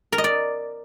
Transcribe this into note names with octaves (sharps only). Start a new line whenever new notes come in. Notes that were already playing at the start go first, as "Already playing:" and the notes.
A#4
D#5
D5